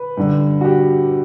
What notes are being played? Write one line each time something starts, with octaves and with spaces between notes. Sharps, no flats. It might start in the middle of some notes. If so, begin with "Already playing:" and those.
Already playing: B4
G2 D3
F#4
G4